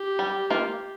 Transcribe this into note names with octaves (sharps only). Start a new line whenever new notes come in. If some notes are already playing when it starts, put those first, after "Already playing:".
Already playing: G4
G3
A#3 F4